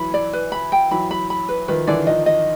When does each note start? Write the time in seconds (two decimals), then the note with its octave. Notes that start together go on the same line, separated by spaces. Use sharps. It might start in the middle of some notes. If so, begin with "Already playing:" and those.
Already playing: E3 F#3 B5
0.14 D5
0.33 B4
0.52 B5
0.72 G5
0.91 E3 F#3 B5
1.11 B5
1.30 B5
1.49 B4
1.68 D#3 F3 B4
1.87 D3 E3 D5
2.07 D#3 F3 D#5
2.26 D#5